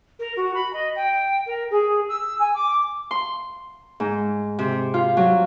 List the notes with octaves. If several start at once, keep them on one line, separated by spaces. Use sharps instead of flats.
A#4
F#4
B5
D#5
G5
A#4
G#4
E6
G#5
D6
C6
G#2
C3
F4
F#3